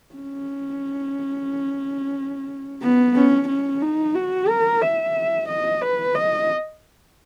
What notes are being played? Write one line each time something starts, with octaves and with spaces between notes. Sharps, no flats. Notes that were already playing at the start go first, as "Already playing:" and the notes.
C#4
B3
C#4
C#4
D#4
F#4
A#4
E5
D#5
B4
D#5